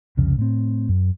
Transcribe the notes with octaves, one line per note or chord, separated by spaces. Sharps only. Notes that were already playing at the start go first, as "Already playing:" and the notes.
C2 F2 C#3
A2 C4
F#2